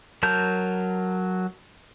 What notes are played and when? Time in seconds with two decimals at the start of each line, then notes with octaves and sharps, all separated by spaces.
0.23 F#3 A#4 A5 G6